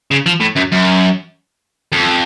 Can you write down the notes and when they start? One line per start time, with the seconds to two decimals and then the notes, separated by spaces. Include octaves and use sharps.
0.11 C#3
0.26 F3
0.41 A2
0.56 F#2
0.72 F#2
1.92 F2